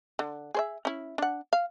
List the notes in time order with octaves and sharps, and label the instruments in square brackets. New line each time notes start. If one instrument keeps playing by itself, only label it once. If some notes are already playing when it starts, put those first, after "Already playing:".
[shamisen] D3
G#4 C5 E5
C#4 E4
D4 F#5
F5